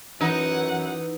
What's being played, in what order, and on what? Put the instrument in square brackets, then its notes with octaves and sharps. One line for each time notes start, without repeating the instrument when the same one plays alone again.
[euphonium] F#2 [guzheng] E3 [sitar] D#4 [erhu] F#5